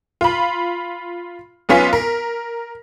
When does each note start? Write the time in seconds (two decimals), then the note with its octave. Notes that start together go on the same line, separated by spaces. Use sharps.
0.21 F4 B5
1.69 B1 B3 C#4 F4 B6
1.93 A#4